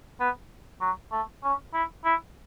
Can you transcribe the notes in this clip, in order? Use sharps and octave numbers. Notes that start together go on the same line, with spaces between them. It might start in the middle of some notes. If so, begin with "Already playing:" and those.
B3
F#3
A3
C#4
E4
E4